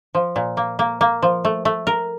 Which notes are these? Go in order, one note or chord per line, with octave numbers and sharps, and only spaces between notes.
F3
A#2
A#3
A#3
A#3
F3
A3
A3
A#4